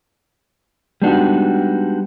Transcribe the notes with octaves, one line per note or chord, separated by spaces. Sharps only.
G3 G#3 B3 D4 D#4 F#4